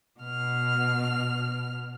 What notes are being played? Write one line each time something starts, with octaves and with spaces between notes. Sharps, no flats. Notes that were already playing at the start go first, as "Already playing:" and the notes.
B2 F6